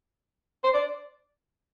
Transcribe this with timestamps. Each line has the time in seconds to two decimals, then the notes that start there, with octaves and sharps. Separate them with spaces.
0.64 C5
0.74 D5